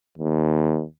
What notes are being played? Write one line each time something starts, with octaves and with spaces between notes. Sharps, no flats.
D#2